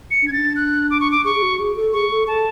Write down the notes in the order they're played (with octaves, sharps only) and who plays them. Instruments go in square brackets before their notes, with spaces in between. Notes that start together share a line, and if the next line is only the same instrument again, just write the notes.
[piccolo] C#7
[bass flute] D4
[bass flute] C#4 [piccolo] G#6
[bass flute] D4 [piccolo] A6
[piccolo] F#6
D6
C#6
D6
[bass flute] G#4 [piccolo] C#6
[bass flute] G#4
F#4
G#4
A4
[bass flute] G#4 [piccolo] C#6
[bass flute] A4
[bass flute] A4 [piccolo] A5